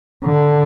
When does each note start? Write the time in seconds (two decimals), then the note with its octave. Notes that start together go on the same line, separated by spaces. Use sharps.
0.24 D3